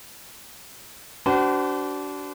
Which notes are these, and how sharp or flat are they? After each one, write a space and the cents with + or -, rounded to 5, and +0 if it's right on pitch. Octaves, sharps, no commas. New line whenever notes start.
D4 -25 F#4 +40 C5 -40